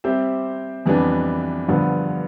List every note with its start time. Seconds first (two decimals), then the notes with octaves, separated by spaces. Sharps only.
0.04 G3 C4 G4 C5 E5
0.86 F2 E3 G3 B3 D4
1.68 G2 D3 F3 B3